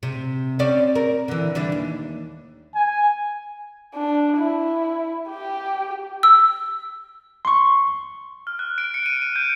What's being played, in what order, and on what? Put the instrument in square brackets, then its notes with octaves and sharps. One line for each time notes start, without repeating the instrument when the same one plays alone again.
[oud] C3
C4 C#4 D5
A#4
D3 E3
E3 G3 D4
D#2
[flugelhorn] G#5
[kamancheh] D4
E4
G4
[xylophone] E6
[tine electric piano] C6 C#6
[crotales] F6
F#6
D7
C#7
D#7
D#7
G6